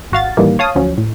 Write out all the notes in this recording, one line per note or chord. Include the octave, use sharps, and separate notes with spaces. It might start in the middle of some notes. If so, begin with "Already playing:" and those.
G#1 F#4 F5 A6
A2 D#3 E3 G3 A#3
C#5 F5 A5 D#6
D2 F3 F#3 C#4
A2